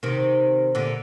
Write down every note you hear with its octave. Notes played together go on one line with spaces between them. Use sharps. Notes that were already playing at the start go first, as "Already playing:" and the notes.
C3 D#3
A#2 D3